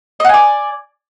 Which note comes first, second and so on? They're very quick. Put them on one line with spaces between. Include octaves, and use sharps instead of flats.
D#5 F#5 G#5 D5